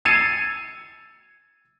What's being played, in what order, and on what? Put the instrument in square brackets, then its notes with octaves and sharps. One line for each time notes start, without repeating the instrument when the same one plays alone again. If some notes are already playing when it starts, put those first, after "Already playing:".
[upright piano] E6 G#6 A6 C7 C#7 D#7